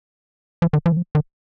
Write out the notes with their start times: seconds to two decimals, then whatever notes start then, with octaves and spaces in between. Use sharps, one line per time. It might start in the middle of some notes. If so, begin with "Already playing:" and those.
0.62 F3
0.73 D#3
0.86 F3
0.92 D#3
0.97 F3
1.15 D#3